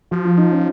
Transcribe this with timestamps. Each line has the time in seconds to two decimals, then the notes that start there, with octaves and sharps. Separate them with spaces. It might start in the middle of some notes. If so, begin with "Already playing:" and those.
0.11 F3 F#4
0.25 F4
0.38 D#4
0.51 C#4